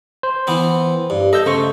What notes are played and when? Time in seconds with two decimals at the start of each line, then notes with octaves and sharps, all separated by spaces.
0.23 C5
0.47 E3 B3 C4
1.10 G2
1.33 A4 D#5 E6 G6
1.46 C#3 A3 C5 C#6